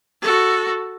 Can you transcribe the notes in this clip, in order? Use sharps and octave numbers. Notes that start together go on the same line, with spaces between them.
F#4 A4